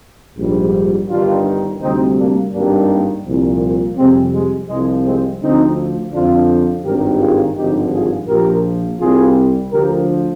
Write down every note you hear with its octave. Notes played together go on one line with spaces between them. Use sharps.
A#1 G#2 G3
G1 G2 D#3 G3 D4 F4
D2 C3 G3 C4 D#4
A#3 D4
G#1 G2 D#3 G3 A#3 D4
C2 A#2 F3
F2 C3 G3 G#3 C4
G#3
C2 C3 F3 G#3
G#3 C4
D2 D3 F3 C4 D#4
F2 D3 F3 D4 F4
G#1 G2 D#3 G3 G4 A#4
F4 G#4
G#1 G2 D3 F3 D#4 G4
F4 G#4
A#1 A#2 F3 G4 A#4
C2 C3 G3 F4 G#4
D2 D3 F3 G4 A#4